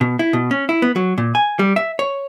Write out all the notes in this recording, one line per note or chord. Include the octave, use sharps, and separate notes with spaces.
B2
E4
B2
C#4
E4
B3
F#3
A#2
G#5
G3
E5
C#5